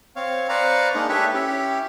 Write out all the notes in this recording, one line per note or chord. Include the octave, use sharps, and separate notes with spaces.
C4 C#5 F5
B4 C5 D5 F5 A#5 C#6
G#3 A#3 D4 D#4
G4 A4 B4 C#5 E5
C#4 E4 G4